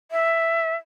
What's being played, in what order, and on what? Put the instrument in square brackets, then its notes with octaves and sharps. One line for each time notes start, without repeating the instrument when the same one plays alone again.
[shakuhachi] E5